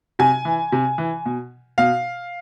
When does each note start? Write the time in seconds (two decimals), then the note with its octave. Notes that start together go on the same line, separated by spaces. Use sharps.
0.19 C3 G#5
0.45 E3
0.72 C3
0.98 E3
1.26 B2
1.78 B2 F5